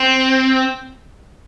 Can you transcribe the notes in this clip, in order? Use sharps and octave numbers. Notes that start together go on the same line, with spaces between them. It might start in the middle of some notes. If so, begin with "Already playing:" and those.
Already playing: C4